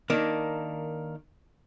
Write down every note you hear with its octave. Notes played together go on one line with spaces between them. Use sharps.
D#3 A#3 D4